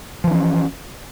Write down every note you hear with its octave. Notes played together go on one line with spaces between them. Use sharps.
E3 F3 C#4 D4